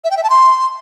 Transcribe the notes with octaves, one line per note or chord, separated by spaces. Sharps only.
E5
G5
E5
A5
C6